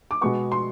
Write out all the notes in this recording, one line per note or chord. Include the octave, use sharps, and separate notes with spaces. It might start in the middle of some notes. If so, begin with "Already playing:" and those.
D6
B2 G#3 B3 C#6
C6